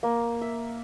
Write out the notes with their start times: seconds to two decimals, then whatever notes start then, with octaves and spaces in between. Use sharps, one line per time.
0.03 A#3
0.41 E5